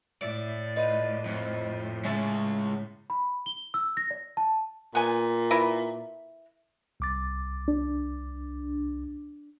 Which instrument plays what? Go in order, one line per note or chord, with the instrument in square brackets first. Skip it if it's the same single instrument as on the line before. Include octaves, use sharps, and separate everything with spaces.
[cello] A2 [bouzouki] E4 [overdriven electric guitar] D5
[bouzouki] D#4 F4 B4
[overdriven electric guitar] F2
[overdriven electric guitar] C#3 G#3 [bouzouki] C#4 E5 A5
[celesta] B5
G7
E6
A#6
D5
A5
[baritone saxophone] A#2 [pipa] B3 G#5
[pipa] E4 A#4 B4
[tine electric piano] C2 D6 A6
[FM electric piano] D4